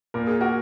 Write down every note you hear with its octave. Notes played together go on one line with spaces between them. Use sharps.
A#2 A#3 A#4
G#4
F#4 A#4